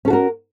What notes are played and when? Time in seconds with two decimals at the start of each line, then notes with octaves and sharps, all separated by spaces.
0.05 C#4
0.08 A4
0.10 F#4
0.13 A#4